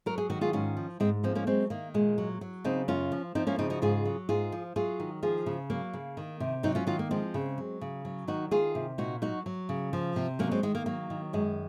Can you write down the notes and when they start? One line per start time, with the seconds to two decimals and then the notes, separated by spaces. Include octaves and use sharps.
0.06 F#3 A#4
0.18 G#4
0.30 D#3 F#4
0.41 F4 G#4
0.53 G#2 C#4 F4
0.77 F3
1.00 G#2 G#3 C4
1.23 F3 G#3 C4
1.35 A#3 C#4
1.47 F#3 G#3 C4
1.70 D#3 A#3
1.94 A#2 G#3
2.18 F#3
2.41 F#3
2.64 C#3 C4 D#4
2.88 F#2 C#4 F4
3.12 F3
3.35 F3 C4 D#4
3.47 A#3 C#4
3.59 C#3 C4 D#4
3.70 D#4 F#4
3.82 G#2 F4 G#4
4.05 F#3
4.29 G#2 F4 G#4
4.52 F3
4.76 F#3 F4 G#4
5.00 D#3
5.23 F3 F4 G#4
5.46 C#3
5.70 F#3 A#3
5.93 C#3
6.17 D#3
6.40 C3
6.63 F#3 C4 D#4
6.75 C#4 F4
6.87 D#3 C#4 F4
6.99 A#3
7.11 F3 G#3 C4
7.34 C#3
7.58 F#3
7.81 C#3
8.05 F#3
8.27 D#3 D#4 F#4
8.51 D#3 F4 G#4
8.75 C3
8.98 A#2 D#4 F#4
9.22 F#3 D#4 F#4
9.46 F#3
9.69 C#3
9.93 F3
10.16 C3
10.39 F#3 A#3 C#4
10.51 G#3 C4
10.63 D#3 G#3
10.75 A#3
10.86 F#3 A#3
11.10 D#3
11.33 F#2 G#3